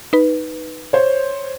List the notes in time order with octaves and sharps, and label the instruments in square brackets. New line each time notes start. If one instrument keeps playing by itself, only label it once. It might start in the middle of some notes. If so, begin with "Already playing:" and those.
[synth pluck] D#4 B4
[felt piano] C5 C#5